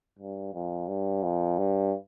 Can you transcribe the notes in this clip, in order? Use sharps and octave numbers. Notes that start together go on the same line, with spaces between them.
G2
F2
G2
F2
G2